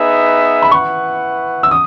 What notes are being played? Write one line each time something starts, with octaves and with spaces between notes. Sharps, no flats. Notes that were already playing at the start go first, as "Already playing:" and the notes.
Already playing: B3 D#4 G#4 B4 E5
B5
E4 B4 F#5 C#6
E6
D#6